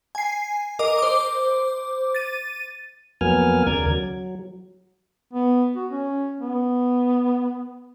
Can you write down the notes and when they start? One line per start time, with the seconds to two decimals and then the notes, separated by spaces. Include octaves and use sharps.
0.15 G#5 C7
0.79 A#4 D#5 D6
0.98 C5 D6
2.15 A6 D#7
3.21 F2 F#3 A#3 B3 G#5 F6
3.67 D#2 C#3 A#4 D5 G#6
3.91 F#3
5.33 B3
5.76 F#4
5.91 C#4
6.41 B3